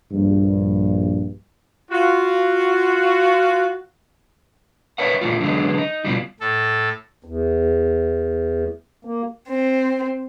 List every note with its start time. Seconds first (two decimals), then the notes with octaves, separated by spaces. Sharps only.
0.11 A#1 G2
1.91 F4 F#4
4.98 A#4 B4 C#5 E5 F#5
5.21 A#2 E3 A3 F4
5.40 D3 E3 F#3 G#3 B3
5.78 D#4
6.05 B2 F3 G3
6.40 A2 A4
7.24 E2
9.05 A#3
9.47 C4